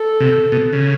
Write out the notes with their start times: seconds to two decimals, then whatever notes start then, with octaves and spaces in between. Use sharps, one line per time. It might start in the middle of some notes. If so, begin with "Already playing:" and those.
Already playing: A4
0.20 C3
0.52 B2
0.73 C#3